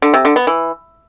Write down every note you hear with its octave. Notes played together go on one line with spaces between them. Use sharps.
D3
C3
D3
B3
E3